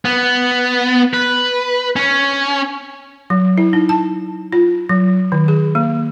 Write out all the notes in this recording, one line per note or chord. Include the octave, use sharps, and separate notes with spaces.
B3
B4
C#4
F#3
E4
D#4
A5
F4
F#3
D#3
G#4
A#3